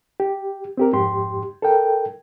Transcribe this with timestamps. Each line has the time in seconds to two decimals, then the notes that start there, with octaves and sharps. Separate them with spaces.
0.20 G4
0.77 C4 G4 A#4
0.93 F2 G#2 G4 C6
1.62 A4 A#4 G5